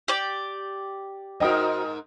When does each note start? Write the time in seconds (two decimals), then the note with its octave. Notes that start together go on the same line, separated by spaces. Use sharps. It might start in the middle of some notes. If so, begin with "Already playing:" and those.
0.08 G4 D5
1.40 G#2 D#4 F#4 A#4 C5 D#5 G5 D#6